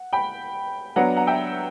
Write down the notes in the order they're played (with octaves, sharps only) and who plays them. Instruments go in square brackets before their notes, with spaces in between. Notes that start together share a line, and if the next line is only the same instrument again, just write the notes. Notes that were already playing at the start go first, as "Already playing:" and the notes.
Already playing: [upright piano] F#5
G5 B5
F#3 B3 D4 F#5 A#5
F#5 A#5
E5 G5